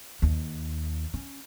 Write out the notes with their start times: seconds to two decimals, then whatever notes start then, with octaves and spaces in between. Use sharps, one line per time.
0.22 D#2
1.14 C#4